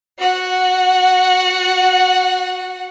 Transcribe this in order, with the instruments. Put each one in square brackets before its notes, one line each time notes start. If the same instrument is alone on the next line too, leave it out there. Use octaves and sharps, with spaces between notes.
[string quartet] F#4 F#5